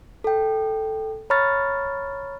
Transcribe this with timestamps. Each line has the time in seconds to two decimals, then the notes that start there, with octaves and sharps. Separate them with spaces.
0.24 A4 G5
1.30 C#5 A#5 B5 C#6 F6 A6